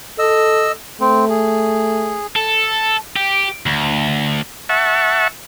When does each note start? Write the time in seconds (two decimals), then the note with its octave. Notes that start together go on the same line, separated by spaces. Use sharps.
0.19 A4 D#5 E6
1.01 A3 C4
1.30 G#4
2.36 A4
3.16 G4
3.66 D2
4.69 E5 F#5 A5 C#6